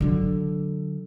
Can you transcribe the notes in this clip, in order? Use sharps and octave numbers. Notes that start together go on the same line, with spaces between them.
D3 F#3